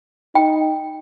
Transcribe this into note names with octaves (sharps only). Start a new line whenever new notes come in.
D#4 G5